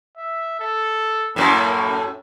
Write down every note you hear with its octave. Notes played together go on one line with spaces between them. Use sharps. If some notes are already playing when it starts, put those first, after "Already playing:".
E5
A4
F#2 A2 A#3